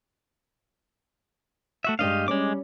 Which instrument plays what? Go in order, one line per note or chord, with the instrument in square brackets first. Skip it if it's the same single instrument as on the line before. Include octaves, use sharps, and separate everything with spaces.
[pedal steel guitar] A3 F#4 E5
[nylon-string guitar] G2 G#3 D4 [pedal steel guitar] G4 D#5 F5
[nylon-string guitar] G3 C#4 [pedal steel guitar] G#3 D6